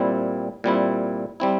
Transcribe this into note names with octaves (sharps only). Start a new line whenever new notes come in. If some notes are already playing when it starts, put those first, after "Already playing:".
Already playing: A#2 G3 C4 E4
A#2 G3 C4 E4
G3 C4 E4